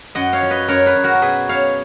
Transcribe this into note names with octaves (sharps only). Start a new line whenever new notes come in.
F#2 D#5 F#5
C#5 F5
F3
B4 D#5
F#2 A#4 C#5
G#4 B4
F#2
F#4 A#4
A#4
B2 G#4 B4
B2 C#5 F5